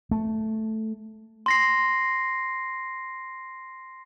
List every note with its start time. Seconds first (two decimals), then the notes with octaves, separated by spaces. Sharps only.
0.11 A3
1.46 C6 A#6 C7